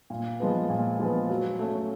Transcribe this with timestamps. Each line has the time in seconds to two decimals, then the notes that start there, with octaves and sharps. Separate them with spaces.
0.10 A#2
0.40 F3 G#3 B3
0.70 A#2
0.99 F3 G#3 B3
1.29 F#3
1.59 A3 C#4